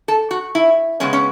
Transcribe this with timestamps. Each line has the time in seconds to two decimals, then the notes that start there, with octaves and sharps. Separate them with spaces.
0.08 A4
0.31 F#4
0.55 E4
1.00 C#3 G#3 B3 C#4
1.13 C#4